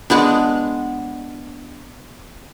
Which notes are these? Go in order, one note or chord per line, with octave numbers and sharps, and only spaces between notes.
G#3 B3 D4